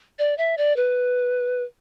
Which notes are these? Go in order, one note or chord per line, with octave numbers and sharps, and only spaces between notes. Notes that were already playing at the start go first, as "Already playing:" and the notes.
D5
E5
D5
B4